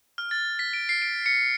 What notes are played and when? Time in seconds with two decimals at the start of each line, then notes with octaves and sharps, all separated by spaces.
0.18 F6
0.31 A6
0.59 B6
0.73 D7
0.89 C7
1.02 D7
1.26 C#7